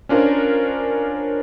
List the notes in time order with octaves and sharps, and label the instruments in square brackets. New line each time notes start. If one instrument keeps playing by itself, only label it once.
[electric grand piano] C#4 D4 F4 A#4 C5